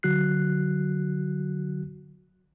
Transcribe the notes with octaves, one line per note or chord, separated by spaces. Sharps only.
D3 F#3 F#4 F#6 C7